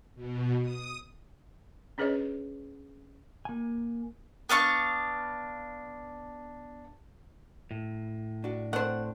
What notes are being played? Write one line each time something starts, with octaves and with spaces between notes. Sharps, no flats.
B2
D#6
C#4 D4 G#4 B4 C#5 D#5
A#3 G#5
B3 D4 F5 C#6
A2
D4 F#4
A3 C4 D4 C5 F#5